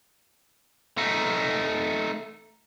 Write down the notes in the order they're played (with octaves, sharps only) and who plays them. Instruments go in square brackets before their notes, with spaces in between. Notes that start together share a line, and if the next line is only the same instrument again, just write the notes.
[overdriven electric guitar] A3 D#4